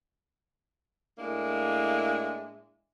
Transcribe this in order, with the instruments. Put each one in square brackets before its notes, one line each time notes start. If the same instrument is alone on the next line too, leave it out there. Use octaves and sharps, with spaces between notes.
[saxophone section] A2 G#3 A#3 D4 E4